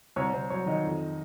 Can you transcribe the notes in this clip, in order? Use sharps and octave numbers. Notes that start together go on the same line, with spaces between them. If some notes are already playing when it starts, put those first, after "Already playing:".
C2 C#5
C2 C5
F#3 C#5
D#3 D#4 D#5
F2